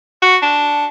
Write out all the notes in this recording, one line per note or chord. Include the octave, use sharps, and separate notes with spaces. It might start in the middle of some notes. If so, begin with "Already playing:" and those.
F#4
D4